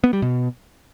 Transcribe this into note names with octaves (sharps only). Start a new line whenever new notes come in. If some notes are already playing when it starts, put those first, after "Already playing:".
B3
G3
B2